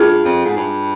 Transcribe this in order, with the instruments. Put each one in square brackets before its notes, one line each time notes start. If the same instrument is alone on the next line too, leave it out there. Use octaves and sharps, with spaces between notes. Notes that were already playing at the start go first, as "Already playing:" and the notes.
Already playing: [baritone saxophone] G2 [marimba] F4 G#4
[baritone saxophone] F2
G#2
G2